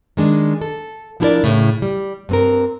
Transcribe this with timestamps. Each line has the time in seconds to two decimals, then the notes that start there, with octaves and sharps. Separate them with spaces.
0.17 D#3 G#3 D4
0.62 A4
1.20 F3 D4 E4 G4 A#4 D5
1.44 A2 C#3
1.82 G3
2.29 G2 C4 A#4